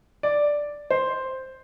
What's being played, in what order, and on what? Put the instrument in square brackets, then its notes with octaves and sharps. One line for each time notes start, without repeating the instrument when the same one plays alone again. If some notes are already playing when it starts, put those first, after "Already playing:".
[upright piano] D5
C5